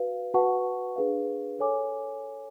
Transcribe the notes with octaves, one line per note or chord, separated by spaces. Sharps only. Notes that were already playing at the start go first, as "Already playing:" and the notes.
Already playing: F#4 B4 F5
F#4 B4 F#5 A5 C#6
D4 G#4 B4 F5
A4 C#5 G#5 D6